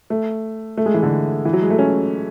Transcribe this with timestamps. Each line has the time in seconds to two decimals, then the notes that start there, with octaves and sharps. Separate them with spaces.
0.10 A3
0.77 A3
0.86 G#3
0.94 E3
1.03 D3
1.45 E3
1.53 F#3
1.62 G#3
1.70 A3
1.78 C#4